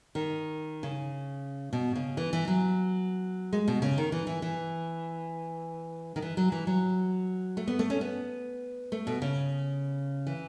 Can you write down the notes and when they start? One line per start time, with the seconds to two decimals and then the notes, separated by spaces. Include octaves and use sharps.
0.15 D#3
0.83 C#3
1.73 B2
1.95 C#3
2.17 E3
2.33 E3
2.47 F#3
3.53 G#3
3.68 B2
3.82 C#3
3.98 D#3
4.12 E3
4.27 E3
4.42 E3
6.16 D#3
6.22 E3
6.37 F#3
6.52 E3
6.67 F#3
7.57 A3
7.67 B3
7.79 A3
7.90 C#4
8.01 B3
8.92 A3
9.07 B2
9.22 C#3
10.27 E3